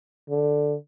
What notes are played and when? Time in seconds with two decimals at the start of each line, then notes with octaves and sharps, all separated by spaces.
0.30 D3